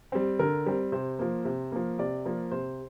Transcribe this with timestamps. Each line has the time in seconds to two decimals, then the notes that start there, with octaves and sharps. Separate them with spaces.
0.12 G3 C4
0.39 D3 A#4
0.66 G3 C4
0.92 C3 C5
1.19 F3 A#3
1.45 C3
1.72 F3 A#3
1.99 C3 D5
2.25 F3 A#3
2.51 C3 C5